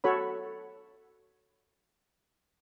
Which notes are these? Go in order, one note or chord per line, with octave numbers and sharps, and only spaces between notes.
F#4 A4 C#5 B5